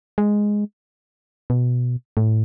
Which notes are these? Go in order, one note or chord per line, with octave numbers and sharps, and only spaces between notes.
G#3
B2
A2